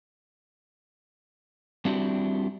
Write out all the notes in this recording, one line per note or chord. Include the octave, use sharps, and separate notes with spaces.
G3 C4 D4 E4 F#4 G4